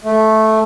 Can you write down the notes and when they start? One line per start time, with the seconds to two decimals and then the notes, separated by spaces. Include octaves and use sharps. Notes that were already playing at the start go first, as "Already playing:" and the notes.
0.04 A3